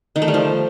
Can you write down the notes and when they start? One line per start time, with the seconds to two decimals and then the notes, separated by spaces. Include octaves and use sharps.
0.16 D#3
0.22 A3
0.28 G3
0.34 F3